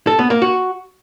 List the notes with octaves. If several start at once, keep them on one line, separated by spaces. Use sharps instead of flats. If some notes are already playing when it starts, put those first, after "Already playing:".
A4
B3
A#3
F#4